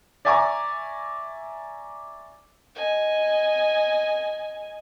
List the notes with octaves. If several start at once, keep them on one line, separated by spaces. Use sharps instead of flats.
D5 E5 G#5 A#5 C#6 D6
D#5 G#5